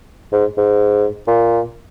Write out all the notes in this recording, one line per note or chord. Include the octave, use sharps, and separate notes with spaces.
G#2
G#2
A#2